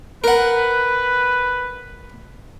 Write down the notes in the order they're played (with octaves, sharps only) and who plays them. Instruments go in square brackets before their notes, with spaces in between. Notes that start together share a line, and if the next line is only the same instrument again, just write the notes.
[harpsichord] A#4 F#5 [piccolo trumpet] B4